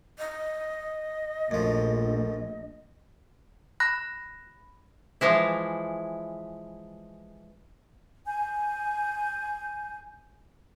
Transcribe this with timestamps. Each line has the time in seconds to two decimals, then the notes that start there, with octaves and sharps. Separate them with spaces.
0.18 D#5
1.51 A#1 F#2 F3 A3
3.80 B5 F#6 A#6
5.21 E3 F3 G#3 E4
8.26 G#5 G6